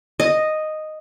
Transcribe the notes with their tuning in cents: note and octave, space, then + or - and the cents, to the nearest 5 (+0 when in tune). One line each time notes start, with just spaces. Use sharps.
D#5 -5